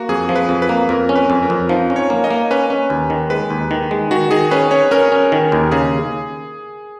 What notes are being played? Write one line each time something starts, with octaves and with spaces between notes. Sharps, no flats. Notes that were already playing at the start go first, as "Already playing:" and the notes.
Already playing: A#3 F#4
F2 G#4
F3
B4
F2
B4
A#3
F2 A#4
C#4
B4
F2
A#4
F2
F3 D#4
C#4
C#5
A#3
D#5
A#3
C#4 B4
C#4
D#2
D#3
G#3 B4
D#2
D#3
G#3
D#3 F#4
D#3 G#4
C#4 B4
C#4 C#5
C#4 A#4
C#4
D#3
D#2
C#3 G#4